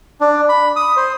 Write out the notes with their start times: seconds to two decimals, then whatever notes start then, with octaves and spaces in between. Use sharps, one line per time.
0.21 D4
0.49 B5
0.76 D#6
0.97 C5